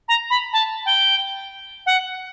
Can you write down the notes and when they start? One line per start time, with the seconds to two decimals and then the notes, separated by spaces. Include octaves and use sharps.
0.08 A#5
0.30 B5
0.53 A5
0.85 G5
1.86 F#5